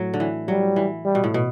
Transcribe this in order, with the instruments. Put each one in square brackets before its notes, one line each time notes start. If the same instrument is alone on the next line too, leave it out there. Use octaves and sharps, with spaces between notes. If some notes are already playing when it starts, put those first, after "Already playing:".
Already playing: [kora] A2 F#3
D3
E3
[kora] F#3 [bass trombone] G3
[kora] E3
[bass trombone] G3
[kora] B2
A2
B2